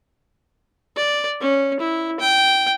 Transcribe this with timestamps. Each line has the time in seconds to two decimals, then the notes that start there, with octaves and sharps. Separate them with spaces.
0.96 D5
1.40 C#4
1.80 E4
2.20 G5